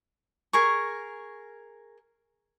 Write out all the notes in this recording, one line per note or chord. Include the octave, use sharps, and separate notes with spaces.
G#4 A#4 C#6